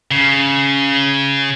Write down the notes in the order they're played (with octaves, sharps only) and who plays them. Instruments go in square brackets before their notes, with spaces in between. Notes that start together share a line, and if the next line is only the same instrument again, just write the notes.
[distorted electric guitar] C#3